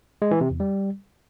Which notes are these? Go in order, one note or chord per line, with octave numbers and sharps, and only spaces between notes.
G#3
E3
C3
E2
G3